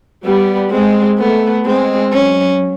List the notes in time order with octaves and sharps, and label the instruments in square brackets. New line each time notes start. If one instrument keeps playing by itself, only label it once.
[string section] G3 [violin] B3
[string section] G#3 [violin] C4
[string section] A3 [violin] B3
[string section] G#3 [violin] C4
[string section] F#3 [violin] C#4